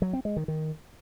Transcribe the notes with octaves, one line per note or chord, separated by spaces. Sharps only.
F#3
C4
G#3
D#3
D#3